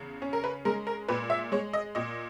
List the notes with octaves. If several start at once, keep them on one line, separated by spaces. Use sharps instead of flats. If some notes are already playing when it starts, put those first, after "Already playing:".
Already playing: E2 C#3
C#4
A#4
B4
G#3 A#4
A#4
A#2 B4
E5
G#3 C#5
D#5
A#2 D#5